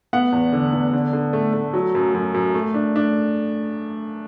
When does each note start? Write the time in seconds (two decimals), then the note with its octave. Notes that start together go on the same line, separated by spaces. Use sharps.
0.13 B3 F#5
0.32 E2
0.53 D3
0.73 B3
0.93 D3
1.13 D3
1.33 A3
1.53 A3
1.74 F#3
1.95 F#2
2.14 F#2
2.34 F#2
2.54 A3
2.74 D4
2.96 D4